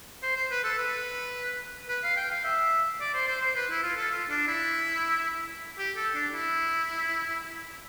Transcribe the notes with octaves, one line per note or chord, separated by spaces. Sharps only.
C5
C5
B4
A4
B4
B4
F5
G5
F5
E5
D5
C5
C5
C5
B4
E4
F4
A4
F4
D4
E4
G4
A4
D4
E4